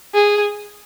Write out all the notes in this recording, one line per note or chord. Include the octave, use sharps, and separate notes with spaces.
G#4